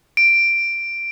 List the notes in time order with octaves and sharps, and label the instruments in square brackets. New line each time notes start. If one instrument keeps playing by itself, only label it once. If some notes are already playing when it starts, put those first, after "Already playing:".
[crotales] D7